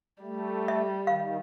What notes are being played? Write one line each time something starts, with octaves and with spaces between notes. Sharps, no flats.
G3 A3
E5
D#3 F5